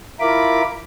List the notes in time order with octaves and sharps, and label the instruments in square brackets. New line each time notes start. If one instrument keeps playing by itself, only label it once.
[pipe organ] E4 F4 A#4 B5 D6